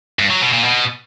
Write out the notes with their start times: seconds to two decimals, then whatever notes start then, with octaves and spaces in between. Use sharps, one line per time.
0.19 G2
0.30 F#3
0.41 B2
0.53 A#2
0.64 B2